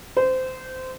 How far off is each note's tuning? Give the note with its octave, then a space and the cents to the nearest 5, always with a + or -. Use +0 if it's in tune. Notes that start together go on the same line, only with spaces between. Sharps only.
C5 -20